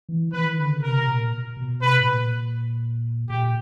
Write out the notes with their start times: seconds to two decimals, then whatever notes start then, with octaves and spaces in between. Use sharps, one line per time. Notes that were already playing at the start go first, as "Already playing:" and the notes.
0.09 E3
0.33 E3 B4
0.45 D#3
0.58 D3
0.70 C#3
0.82 C3 A#4
1.07 A#2
1.57 B2
1.81 C3 B4
2.00 A2
2.05 A#2
3.29 A#2 G4